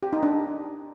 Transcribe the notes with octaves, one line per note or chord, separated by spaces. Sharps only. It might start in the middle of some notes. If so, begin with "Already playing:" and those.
G4
D#4
D4